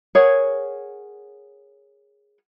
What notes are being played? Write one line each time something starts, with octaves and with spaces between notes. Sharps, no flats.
G#4 A#4 C#5 F#5